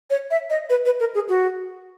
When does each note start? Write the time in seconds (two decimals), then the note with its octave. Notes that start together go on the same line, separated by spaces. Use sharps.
0.10 C#5
0.31 E5
0.50 D#5
0.70 B4
0.86 B4
1.00 A#4
1.15 G#4
1.29 F#4